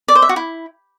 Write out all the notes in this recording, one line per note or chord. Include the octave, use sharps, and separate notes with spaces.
D5
C5
E5
F#4
E4